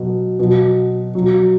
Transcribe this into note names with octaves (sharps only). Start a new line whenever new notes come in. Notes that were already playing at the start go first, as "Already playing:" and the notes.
Already playing: B2 F#3
B2 F#3
B2 F#3